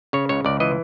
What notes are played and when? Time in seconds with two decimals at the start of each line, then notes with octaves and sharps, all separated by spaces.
0.13 C#3 C#5
0.29 C#2 C#5
0.45 C#2 D5
0.60 E3 D#5